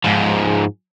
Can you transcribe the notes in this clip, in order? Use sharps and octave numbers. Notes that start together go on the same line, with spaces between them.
G#2 F3